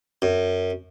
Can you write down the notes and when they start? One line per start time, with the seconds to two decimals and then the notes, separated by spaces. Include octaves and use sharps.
0.22 F#2